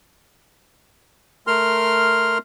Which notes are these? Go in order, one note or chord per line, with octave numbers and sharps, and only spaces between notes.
A3 A#4 C6 F6